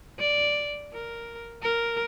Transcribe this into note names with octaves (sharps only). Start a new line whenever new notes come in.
D5
A#4
A#4